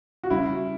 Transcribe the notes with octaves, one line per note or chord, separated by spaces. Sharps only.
F#4
C#3 G3 C#4 E4